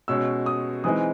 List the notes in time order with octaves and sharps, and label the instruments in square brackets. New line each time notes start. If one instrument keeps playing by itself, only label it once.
[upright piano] B2 G#3 C#4 E6
D#6
E3 G#3 C4 D#4 D#6